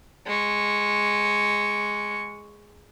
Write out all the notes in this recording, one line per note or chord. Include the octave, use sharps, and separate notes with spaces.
G#3 C#6